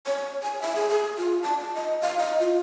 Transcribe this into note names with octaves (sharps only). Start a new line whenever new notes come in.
C#5
G#5
E5
G#4
G#4
F4
A5
A5
D#5
F5
D#5
F4